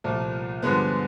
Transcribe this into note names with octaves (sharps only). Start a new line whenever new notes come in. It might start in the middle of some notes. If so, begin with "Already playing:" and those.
C2 A#2 F3 A3
G2 D3 F3 G#3 B3